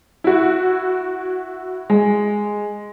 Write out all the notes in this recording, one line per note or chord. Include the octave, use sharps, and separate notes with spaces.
E4 F#4
G#3